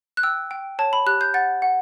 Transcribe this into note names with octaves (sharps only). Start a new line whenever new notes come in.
F#6
G5 E6
G5
C#5 A5
B5
G4 F#6
G6
F#5 A6
F#5